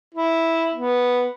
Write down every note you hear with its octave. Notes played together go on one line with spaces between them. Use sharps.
E4
B3